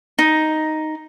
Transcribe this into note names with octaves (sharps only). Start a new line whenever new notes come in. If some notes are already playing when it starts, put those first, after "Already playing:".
D#4